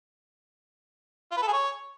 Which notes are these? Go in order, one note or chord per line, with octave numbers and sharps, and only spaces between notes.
F4
B4
A4
G#4
C#5